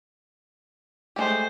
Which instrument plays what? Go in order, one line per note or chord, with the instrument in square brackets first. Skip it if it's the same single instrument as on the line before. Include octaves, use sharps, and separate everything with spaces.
[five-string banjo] G#3 G4 [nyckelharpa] A3 C5